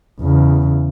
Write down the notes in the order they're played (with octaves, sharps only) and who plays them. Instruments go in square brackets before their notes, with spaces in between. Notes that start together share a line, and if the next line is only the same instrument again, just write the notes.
[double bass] E2 C#3